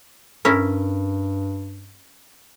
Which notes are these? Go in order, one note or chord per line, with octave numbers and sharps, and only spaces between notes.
G2 C#4 E4 A#4